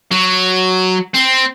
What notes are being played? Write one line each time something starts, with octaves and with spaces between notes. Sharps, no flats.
F#3
C4